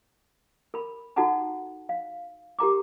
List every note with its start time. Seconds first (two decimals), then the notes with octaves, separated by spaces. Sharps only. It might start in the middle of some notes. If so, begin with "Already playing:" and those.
0.74 A#4 B5
1.16 D#4 F#4 A4 F#5 A5 A#5
1.89 F5
2.59 G4 A#4 A#5 D6